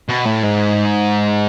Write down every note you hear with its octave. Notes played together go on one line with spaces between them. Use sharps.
B2
A2
G#2